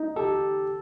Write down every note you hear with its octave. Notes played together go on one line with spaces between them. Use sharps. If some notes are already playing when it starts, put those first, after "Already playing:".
Already playing: D#4
G4 A4